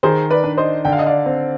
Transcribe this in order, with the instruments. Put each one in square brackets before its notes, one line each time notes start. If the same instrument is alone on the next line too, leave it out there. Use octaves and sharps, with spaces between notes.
[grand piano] D#3 [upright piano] G#4 C5
[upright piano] B4 D5
[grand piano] D4
[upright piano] C5 D#5
[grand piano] D3 [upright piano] G5
[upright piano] F5
D#5
D5 F5
[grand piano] C4